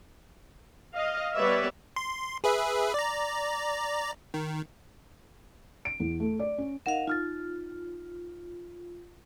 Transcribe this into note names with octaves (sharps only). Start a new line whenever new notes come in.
D#5 F5
G3 B3 B4 C#5 D5 E5
C6
G#4 B4 E5
D5 A#5
D#3
D7
E2
A3
D5
C#4
D#4 A#4 D#5 F5 F#5 E7
D#4 F4 F6 A6